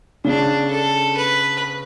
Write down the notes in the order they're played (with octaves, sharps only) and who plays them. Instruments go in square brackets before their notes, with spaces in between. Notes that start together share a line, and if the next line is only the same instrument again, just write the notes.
[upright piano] C#3 [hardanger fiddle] D4
[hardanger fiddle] A4
B4